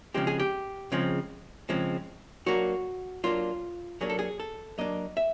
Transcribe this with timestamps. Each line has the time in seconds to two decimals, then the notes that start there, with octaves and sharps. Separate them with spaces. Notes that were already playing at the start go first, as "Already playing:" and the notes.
0.14 C#3 F3 G#3 C4 G4
0.27 G#4
0.40 G4
0.92 C#3 F3 G#3 C4
1.69 C#3 F3 G#3 C4
2.46 F#3 A#3 D4 F#4
3.24 F#3 A#3 D4 F4
4.01 F#3 A#3 D4 G#4
4.10 A4
4.19 G#4
4.40 A4
4.78 F#3 A#3 D4 D#5
5.17 E5